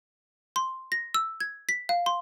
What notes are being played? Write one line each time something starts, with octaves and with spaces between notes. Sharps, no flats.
C6
A#6
E6
G#6
B6
F5
C6